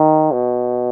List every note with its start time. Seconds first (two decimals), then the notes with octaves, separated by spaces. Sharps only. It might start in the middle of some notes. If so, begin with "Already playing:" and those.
Already playing: D#3
0.32 B2